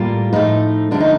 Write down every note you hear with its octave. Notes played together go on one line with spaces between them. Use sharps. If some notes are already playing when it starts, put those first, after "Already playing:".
Already playing: A2 G3 A#3 F4
A2 F3 A3 D#4
D3 F3 A3 D4
D#4